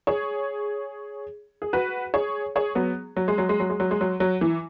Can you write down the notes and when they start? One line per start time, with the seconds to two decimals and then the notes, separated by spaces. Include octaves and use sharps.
0.07 G#4 C#5
1.62 G#4
1.73 F#4 B4
2.14 G#4 C#5
2.56 G#4 C#5
2.75 F#3 B3
3.16 F#3
3.28 G#3
3.38 F#3
3.49 G#3
3.60 F#3
3.70 G#3
3.80 F#3
3.91 G#3
4.01 F#3
4.20 F#3
4.41 E3